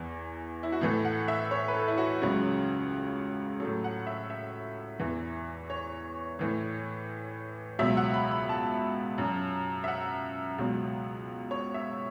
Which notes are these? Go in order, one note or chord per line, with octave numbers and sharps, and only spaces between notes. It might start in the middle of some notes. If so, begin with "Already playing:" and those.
Already playing: E2 E3
E4
F#4
A2 E3 A4
F#5
E5
C#5
B4
A4
E4
F#4
C#2 C#3 F#3
F#3 A4
A2
F#5
E5
E5
E2 E3
C#5
A2 E3
C#2 B2 F#3 E5
F#5
B5
B5
A5
F#2 F#3
E5
F#5
C#2 B2 F#3
C#5
E5